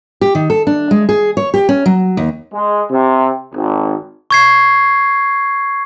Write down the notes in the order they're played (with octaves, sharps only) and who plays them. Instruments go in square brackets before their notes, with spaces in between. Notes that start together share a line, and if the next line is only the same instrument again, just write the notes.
[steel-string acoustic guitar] G4
D#3
A4
D4
G#3
G#4
C#5
G4
C#4
F#3
D#2
[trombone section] G#3
C3
G#1
[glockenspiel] C#6 G#6 C7